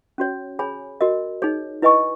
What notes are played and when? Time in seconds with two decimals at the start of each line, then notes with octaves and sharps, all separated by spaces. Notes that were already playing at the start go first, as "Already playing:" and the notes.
0.18 C#4 F#4 C#5
0.59 G#4 C#5 G#5 B5
1.01 F#4 A#4 D#5
1.42 D#4 G#4 C#5
1.82 E4 B4 D#5 G#5 C#6